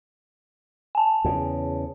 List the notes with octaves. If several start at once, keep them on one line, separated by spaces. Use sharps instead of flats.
G#5 A5
E2 C#3